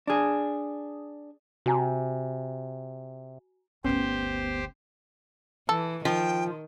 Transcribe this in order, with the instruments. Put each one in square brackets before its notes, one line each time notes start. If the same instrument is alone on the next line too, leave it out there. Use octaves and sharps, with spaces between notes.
[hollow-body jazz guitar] D4 G#4
[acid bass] C3 [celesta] F#4 G#5 A#5
[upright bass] G1 D2 [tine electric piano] B3 [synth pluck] C#4 [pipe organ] G4 C5
[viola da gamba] E3 [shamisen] A4
[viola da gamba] D#3 [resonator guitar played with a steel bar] F3 [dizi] G5